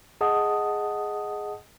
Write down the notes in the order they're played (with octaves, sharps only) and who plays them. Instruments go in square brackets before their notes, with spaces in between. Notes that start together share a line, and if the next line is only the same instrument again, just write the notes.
[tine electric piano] G#4 D#5 F#5 A5 D#6